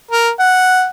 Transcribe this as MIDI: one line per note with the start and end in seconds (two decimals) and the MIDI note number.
0.11 0.30 70
0.39 0.87 78